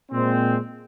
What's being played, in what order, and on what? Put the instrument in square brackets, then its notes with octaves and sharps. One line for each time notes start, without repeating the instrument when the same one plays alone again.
[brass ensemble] A#2 G#3 C4